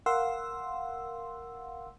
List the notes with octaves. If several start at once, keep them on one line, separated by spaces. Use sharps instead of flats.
A#4 F5 F#5 C6 E6